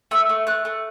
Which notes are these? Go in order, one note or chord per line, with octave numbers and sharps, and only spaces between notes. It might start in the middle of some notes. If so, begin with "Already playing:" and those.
A3 E6
A3
A3 F#6
A3